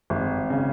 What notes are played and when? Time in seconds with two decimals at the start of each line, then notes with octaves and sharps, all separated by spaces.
0.10 G#1
0.50 C#3